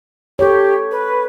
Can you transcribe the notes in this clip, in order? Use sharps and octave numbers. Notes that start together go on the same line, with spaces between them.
G4 A4 C#5
B4